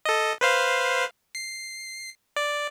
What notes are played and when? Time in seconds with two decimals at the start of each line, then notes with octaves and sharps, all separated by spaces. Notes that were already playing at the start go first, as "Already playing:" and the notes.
0.05 A4 D#5
0.41 B4 C5 F5
1.35 C7
2.36 D5